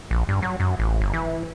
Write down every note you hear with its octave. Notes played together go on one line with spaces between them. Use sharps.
A#1
G2
F#3
F#2
A1
G1
E3